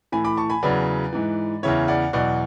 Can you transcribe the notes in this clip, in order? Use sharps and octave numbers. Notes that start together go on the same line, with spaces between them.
A2 E3 G#5 B5
B5 D6
A5 C#6
G#5 B5
E2 C#3 F#3 B4 D5
G#2 E3
E2 C#3 E3 C#5 E5
D5 F#5
E2 B2 F#3 D5 F#5